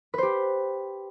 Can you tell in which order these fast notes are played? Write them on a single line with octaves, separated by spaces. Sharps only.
B4 C5 G4